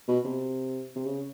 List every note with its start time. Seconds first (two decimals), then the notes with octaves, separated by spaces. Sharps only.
0.08 B2
0.25 C3
0.96 C3
1.06 C#3